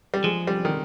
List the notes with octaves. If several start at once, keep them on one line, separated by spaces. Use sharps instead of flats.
G3
F3 G#3
G3
D#3